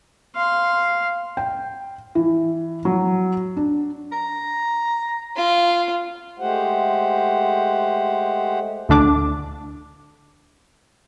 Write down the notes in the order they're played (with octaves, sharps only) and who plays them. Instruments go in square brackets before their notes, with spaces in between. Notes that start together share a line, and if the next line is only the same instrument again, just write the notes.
[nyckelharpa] F5 C6
[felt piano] G5
E3
F#3
D4
[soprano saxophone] A#5
[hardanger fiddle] F4
[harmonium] G#3 A3 G4 C5 F#5
[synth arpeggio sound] D2 D3 D4 D6